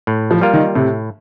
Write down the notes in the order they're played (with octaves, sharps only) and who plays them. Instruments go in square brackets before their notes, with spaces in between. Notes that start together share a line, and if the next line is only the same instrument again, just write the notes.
[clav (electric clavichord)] A2
[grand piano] F3
[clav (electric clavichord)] G3 A#3 F4 A#4
[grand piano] D#3
[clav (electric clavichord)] A2 [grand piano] C3